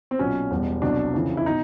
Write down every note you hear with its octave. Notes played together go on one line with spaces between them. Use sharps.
C4
B1 A#2 F#3 C#4
E1 E2 B2 G3
C2 B2 F#3 D4
F2 C#3 E3
E4
B2 D#4